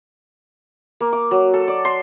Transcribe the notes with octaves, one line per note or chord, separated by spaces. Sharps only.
A#3
D6
F#3
A4
D5
C6